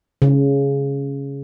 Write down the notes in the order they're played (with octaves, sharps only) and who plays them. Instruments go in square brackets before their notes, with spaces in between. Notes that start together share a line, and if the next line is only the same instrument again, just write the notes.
[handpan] C#3